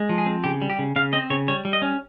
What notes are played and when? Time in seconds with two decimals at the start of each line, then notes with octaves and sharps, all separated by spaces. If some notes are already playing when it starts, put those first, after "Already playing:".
Already playing: G#3
0.09 F3
0.18 G#4
0.26 C4
0.44 C#3 G4
0.62 G3
0.70 G4
0.79 C#3
0.96 C#3 F5
1.13 C4 D#5
1.30 C#3 C#5
1.48 G3 C#5
1.65 G3
1.73 D#5
1.82 C#4